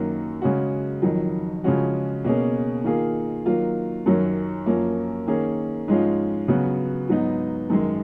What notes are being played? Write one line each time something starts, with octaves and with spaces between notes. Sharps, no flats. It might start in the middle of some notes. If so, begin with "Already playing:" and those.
Already playing: F#2 D#3 F#3 A#3
C#3 G#3 C#4 F#4
F2 D#3 F#3
C#3 F3 G#3 C#4 F#4
B2 A#3 C#4 G#4
D#3 A#3 F4 G#4
D#3 F#3 A#3 F4
F#2 D#3 F#3 C#4
F#2 F3 A#3 C#4
D#3 A#3 C#4 G#4
G#2 F3 G#3 C#4 F4
C#3 F#3 B3 F#4
G#2 F#3 B3 D#4
F#2 D#3 G#3